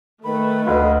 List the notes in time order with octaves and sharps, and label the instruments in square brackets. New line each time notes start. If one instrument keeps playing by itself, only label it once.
[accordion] D#3 B5 [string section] A3 [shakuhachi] B4
[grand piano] D2 D#5 [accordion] F5 B5